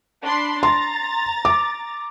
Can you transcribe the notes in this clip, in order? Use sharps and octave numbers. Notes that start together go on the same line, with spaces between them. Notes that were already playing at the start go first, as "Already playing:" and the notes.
D4 B5 C6
A#5 C6 A6
D6